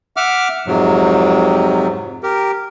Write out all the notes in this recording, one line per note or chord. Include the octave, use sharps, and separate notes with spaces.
E5 F#5 D6 F6
F2 G#2 C3 F#3
G4 A#4